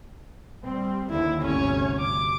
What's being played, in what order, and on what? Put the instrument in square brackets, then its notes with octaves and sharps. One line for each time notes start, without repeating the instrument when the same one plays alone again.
[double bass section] G3 C4
[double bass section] D#2 D3 [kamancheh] E4
[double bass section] G1 D2 C3 [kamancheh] C#4 C#5
[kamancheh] D6